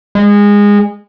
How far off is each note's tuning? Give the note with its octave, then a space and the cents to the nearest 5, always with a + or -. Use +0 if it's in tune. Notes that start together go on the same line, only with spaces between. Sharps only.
G#3 -20